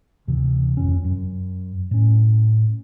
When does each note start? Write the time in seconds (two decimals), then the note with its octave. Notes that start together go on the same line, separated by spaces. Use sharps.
0.27 D2 C3 E3
0.77 G#1 F2 C#4
1.05 F#2
1.91 A2 C#4